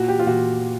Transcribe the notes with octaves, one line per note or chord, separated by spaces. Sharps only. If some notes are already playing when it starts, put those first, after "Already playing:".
Already playing: A#2 F#4
G4
F4
A#2 F#4